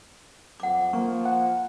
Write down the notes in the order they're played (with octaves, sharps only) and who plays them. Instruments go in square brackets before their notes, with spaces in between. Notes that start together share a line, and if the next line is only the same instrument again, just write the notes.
[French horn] F2 [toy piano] F#5 D6
[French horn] F3 [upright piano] A#3 [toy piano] C#6
[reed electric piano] F#5